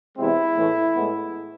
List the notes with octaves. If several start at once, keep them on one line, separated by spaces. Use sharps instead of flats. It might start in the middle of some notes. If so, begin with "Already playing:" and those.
E2 C3 G#3 C4 E4
A2 E3 A3
A2 G#3 B3